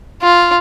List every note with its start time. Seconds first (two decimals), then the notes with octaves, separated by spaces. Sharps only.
0.22 F4